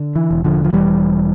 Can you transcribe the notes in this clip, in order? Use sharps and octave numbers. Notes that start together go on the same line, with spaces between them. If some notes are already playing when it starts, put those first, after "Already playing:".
Already playing: D3
E3
E1
D3 F3
F3
E1 E3 G3